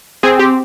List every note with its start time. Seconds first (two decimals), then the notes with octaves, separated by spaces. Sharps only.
0.23 C4 G#4
0.39 G4